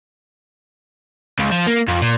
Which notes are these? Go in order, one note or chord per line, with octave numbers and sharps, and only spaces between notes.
C#2
F3
A#3
F2
A#2